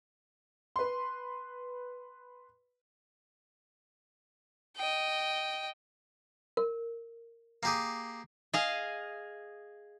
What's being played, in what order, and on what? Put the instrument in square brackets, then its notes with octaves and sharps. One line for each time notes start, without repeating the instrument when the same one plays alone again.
[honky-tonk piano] B4 C6
[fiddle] D#5 G5
[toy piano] A#4
[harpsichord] A#3 G4 G#4
[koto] G#4 D#5 F5